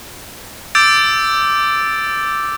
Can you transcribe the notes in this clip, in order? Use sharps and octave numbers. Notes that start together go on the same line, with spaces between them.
D6 E6 G6 A6 D7